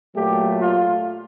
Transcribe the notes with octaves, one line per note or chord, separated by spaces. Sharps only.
A#2 F#3 A3 G4
F4